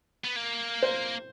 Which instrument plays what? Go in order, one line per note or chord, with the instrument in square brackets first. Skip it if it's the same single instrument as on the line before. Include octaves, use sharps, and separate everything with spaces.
[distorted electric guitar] B3
A#3
[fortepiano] C5